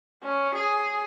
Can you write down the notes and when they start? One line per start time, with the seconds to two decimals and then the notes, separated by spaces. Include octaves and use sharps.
0.23 C#4
0.55 G#4